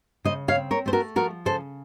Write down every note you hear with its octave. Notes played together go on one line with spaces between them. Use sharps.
C#3 C5 D#5
C#5 F5
C4
A#4 C#5
A3 C5
F#4 A#4
F3 F#4 A#4
C#3 A4 C5